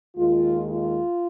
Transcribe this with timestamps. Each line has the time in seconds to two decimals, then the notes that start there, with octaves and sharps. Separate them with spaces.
0.17 D#2 D#3 G#3 F4
0.70 F4